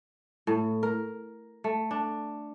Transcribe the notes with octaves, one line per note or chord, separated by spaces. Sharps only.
A2
A#4
A3
D4